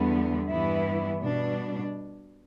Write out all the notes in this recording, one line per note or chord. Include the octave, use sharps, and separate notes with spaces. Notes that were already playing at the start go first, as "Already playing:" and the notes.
Already playing: E2 D3 G3 B3
G2 E3 G3 B3 E4
B2 G3 D4